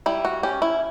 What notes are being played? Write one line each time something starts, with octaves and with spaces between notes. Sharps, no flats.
G3 E4
F#4
C#4 G4
E4